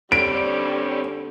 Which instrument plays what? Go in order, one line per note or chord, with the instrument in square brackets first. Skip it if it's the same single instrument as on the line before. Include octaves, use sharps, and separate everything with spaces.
[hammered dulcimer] D3 [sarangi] G3 [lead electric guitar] C4 C#4 [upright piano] D7